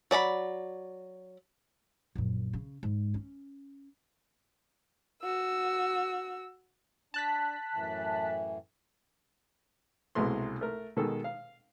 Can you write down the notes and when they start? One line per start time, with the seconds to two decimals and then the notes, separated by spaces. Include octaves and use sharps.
0.11 F#3 D5 A#5 B5
2.15 A#1 F#2
2.53 C#3
2.83 G#2
3.14 C#4
5.23 F#4 E6
7.14 D4 A5 F#6 B6
7.74 F#2 A2 E3
10.15 C2 B2 G#3 A3 C6
10.61 A3 A#4
10.97 B2 D#3 G#3 A4
11.24 F5